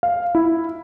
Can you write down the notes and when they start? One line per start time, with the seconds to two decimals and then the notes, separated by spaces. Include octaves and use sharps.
0.03 F5
0.35 E4